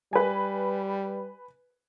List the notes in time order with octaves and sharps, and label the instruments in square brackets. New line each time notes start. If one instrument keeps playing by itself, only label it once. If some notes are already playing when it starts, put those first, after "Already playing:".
[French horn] G3 [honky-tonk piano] B4 G#5